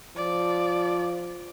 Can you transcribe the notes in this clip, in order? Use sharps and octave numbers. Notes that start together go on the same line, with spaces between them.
F3 D5